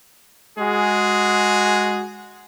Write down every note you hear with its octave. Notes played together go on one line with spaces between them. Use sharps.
G#3 F#4 G#4